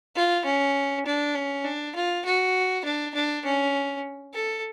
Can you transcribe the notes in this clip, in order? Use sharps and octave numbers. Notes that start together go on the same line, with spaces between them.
F4
C#4
D4
C#4
D4
F4
F#4
D4
D4
C#4
A4